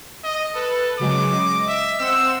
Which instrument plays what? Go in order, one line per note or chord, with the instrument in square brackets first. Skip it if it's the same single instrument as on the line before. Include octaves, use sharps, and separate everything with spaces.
[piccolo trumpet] D#5
[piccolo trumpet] A4 [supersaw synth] B4
[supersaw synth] C#3 F#3 G#3 [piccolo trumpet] D6
[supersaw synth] D#5
[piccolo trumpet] E5
[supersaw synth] C4 C5 F#5 [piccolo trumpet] E6